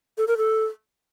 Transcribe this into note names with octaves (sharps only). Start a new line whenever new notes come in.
A4
A#4
A4